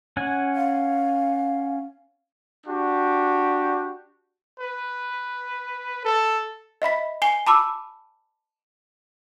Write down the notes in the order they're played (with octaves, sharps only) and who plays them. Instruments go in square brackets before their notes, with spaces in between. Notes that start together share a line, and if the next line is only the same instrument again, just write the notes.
[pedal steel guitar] C#4 F#5 G#5
[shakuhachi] F5
[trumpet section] D4 F#4 G4
[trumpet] B4
A4
[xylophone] D#5 E5 B5 B6
G#5 C7 G7
A5 B5 D6 E6